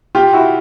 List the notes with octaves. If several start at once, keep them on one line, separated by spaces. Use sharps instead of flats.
F4 G4
E4 F#4